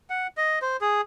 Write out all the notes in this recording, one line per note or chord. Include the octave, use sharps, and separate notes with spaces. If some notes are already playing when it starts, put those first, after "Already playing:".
F#5
D#5
C5
G#4